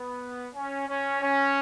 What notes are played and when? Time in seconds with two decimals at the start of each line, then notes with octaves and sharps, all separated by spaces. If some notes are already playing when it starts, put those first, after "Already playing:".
Already playing: B3
0.55 C#4
0.88 C#4
1.21 C#4